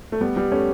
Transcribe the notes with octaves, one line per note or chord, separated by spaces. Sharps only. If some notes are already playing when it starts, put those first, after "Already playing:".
A3
G3 B3
G3 B3
A3 C#4